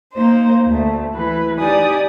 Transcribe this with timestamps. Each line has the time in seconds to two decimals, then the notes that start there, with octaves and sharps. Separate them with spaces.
0.13 A#3 D#4 C5
0.67 D2 A3
1.14 E3 B4
1.59 D#4 G4 D5 G#5 D#6